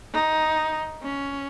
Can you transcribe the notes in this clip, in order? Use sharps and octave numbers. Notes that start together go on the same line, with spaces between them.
D#4
C#4